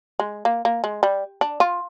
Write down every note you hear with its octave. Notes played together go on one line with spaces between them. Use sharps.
G#3
A#3
A#3
G#3
G3
D4
F4